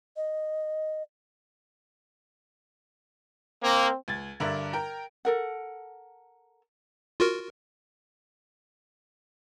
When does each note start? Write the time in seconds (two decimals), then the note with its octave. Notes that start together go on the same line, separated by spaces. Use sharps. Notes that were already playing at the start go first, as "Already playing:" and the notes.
0.17 D#5
3.63 A#3 C4
4.08 C#2 G#6 A6
4.40 G2 D3 D4 A#4 E5
4.73 A#4 G5 A#5
5.25 A4 A#4 F#5
7.20 F4 F#4 A#4